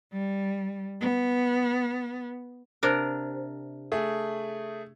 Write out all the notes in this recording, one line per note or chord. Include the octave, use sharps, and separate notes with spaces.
G3
B3
C3 D4 A#4
A3 G#4